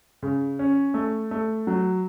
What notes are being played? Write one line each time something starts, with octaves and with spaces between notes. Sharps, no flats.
C#3
C#4
A3
A3
F#3